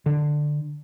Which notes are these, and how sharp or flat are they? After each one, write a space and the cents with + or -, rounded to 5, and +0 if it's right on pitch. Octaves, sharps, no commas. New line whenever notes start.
D3 +10